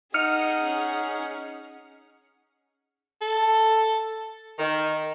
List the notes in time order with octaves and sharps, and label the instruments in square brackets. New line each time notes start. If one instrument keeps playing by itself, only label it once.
[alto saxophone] D#4 [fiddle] G#4 F#5 [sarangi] D#5 [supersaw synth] F6 C#7
[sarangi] C#4
[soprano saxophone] A4
[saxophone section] D#3